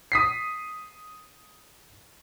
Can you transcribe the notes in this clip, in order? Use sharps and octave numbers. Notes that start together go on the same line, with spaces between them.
D#6 B6 C7